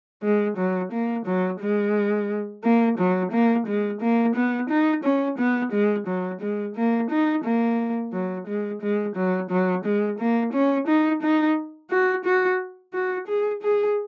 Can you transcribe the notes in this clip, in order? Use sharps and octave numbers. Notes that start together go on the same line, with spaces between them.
G#3
F#3
A#3
F#3
G#3
A#3
F#3
A#3
G#3
A#3
B3
D#4
C#4
B3
G#3
F#3
G#3
A#3
D#4
A#3
F#3
G#3
G#3
F#3
F#3
G#3
A#3
C#4
D#4
D#4
F#4
F#4
F#4
G#4
G#4